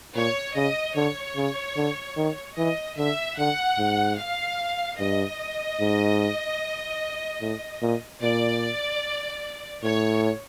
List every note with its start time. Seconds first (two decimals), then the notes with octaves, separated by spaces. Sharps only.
0.16 A#2 C#5
0.56 C#3 D#5
0.96 D3 C#5
1.36 C#3
1.77 D3
2.17 D#3
2.57 E3 D#5
2.98 D3 E5
3.38 D3 F#5
3.79 G#2
4.18 F5
5.00 G2 D#5
5.80 G#2
7.41 A2
7.82 A#2
8.22 A#2 D5
9.83 A2 C#5